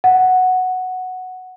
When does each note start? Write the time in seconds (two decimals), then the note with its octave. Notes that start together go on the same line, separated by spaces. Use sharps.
0.04 F#5